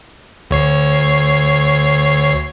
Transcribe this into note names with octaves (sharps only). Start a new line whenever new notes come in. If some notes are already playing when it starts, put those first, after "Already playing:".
D2 C#5 C7